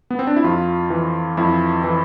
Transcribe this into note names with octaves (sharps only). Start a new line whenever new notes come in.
B3
C4
D4
E4
F2 F4
E3
F2 E4
E3